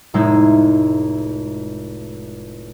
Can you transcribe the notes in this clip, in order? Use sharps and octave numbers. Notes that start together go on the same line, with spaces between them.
F1 A2 G#3 D#4 E4 E6